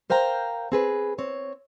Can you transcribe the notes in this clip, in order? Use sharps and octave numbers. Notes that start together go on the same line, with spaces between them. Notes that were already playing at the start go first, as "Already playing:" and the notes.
A#4 C5 F5 G5 A#5
C4 G#4 B4
C4 C#5